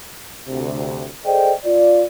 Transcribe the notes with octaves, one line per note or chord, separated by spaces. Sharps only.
D2 C3
G#4 A4 C5 D5 D#5 G5
F4 D5